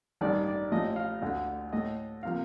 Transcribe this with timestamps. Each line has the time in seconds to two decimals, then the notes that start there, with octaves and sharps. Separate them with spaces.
0.21 A1 G2 D#3 D5
0.47 D5
0.72 A1 A2 F3 A3 D#5
0.96 F5
1.22 D2 D3 A3
1.73 A2 A3 D#5
2.23 C3 F3 A#3 F5